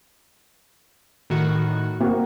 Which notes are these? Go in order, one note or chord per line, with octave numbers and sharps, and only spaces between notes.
A2 D#3 F#4
A#3 C4 F#4